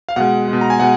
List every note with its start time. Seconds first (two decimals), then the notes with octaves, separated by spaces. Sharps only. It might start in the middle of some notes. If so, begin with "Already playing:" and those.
0.09 F5
0.16 B2 G#3 F#5
0.48 B2 G#3
0.61 A#5
0.70 G#5
0.80 B2 G#3 F#5